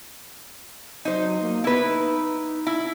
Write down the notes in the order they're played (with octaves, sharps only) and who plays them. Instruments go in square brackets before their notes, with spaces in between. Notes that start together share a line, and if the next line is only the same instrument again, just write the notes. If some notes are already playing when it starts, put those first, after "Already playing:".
[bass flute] F#3 [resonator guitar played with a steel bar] D#4 C5
[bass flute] A#3
[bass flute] B3 [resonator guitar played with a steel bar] E4 B4
[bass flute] D#4
[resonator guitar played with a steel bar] E4